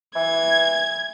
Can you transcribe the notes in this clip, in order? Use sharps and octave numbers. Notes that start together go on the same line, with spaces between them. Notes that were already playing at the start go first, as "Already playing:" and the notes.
E3 G#6